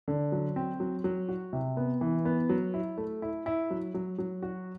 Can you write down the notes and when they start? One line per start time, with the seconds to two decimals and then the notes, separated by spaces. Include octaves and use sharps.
0.08 D3
0.32 F#3
0.56 C4
0.80 F#3
1.04 F#3
1.29 F#4
1.53 C3
1.77 B3
2.01 E3
2.25 B3
2.49 F#3
2.74 E4
2.98 A3
3.22 E4
3.46 E4
3.70 F#3
3.94 F#3
4.18 F#3
4.42 F#4